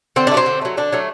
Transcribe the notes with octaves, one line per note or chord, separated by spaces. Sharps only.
D3 C4
A3 D4
F#3 C4
D3
F#3 A3
D3 D4
F#3 A3